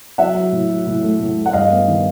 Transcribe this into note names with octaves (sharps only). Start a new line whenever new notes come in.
F#3 E5 F#5
F#3
A2
F#3
A2
A3
A2
A3
F#5
G2 D#5 F5
B3
D#3